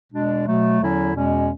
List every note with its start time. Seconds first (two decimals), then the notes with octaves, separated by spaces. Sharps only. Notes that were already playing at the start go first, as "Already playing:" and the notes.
0.12 E2 B2 G#3 D4
0.46 B2 F#3 A3
0.80 E2 D3 F#3 C#4 E4
1.15 E2 B2 G#3 C#4